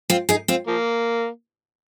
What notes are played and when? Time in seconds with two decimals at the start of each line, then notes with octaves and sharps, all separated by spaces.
0.10 C4 F4
0.29 D#4 G#4
0.48 C4 F4
0.67 F3 A#3